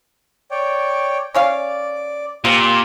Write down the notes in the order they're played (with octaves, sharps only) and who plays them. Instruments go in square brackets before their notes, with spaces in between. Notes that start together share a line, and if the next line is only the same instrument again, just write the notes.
[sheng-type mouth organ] C#5 D5 G5
[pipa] C#4 C#5 F5 [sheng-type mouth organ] D5
[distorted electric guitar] A#2 [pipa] A#3 C4 [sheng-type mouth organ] G4